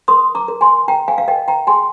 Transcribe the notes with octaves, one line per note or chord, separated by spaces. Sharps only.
A#4 C6 D#6
A#5 D6
A#4
G#5 C6
A#4 G5 A#5
F5 G#5
F5
A#4 D#5 G5
G5 A#5
G#4 G#5 C6